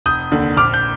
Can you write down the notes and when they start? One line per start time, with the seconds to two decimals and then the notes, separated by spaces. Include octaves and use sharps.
0.06 F1 D#6 G6
0.32 D#2 D3
0.56 A#1 D6 F6
0.74 G6